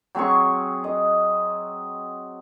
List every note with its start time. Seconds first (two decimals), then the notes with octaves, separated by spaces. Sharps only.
0.15 F#3 C4 G#4 C#6
0.84 D#5